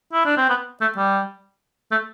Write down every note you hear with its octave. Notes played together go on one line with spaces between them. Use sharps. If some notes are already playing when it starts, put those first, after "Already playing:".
E4
D4
C4
B3
A3
G3
A3